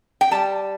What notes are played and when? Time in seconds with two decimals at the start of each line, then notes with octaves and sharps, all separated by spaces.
0.21 G5
0.31 G3 A5